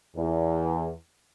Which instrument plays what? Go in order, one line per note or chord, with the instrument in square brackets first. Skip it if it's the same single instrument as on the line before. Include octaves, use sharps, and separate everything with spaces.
[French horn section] E2